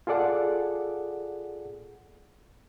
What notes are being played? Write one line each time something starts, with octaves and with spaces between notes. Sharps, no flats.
F4 G#4 A4 D5 F#5